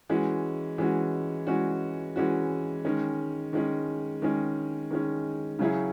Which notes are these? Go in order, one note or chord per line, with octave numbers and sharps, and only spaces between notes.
E3 G#3 C#4 F#4
E3 G#3 C#4 F#4
E3 G#3 C#4 F#4
E3 G#3 C#4 F#4
D#3 G#3 C#4
D#3 G#3 C#4
D#3 G#3 C#4
D#3 G#3 C#4
C#3 F#3 C#4 E4 G#4